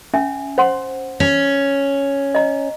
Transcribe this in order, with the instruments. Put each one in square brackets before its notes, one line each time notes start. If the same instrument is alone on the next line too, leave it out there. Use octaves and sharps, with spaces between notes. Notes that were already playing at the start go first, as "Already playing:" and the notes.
[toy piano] C#4 E5 G#5
C5 F#5 C6
[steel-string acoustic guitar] C#4
[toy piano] D#5 A#5